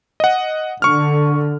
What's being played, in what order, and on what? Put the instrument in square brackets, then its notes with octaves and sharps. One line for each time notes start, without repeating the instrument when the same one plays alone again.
[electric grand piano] D#5 F#5
[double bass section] D3 [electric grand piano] C#6 F6